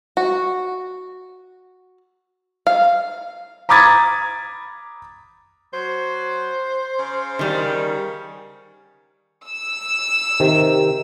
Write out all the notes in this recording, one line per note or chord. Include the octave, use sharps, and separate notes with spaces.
F#4
F5
A#5 B5 D6 D#6 G#6 A6
F#3 C5
C#3
D#3 G3
E6
C3 D#3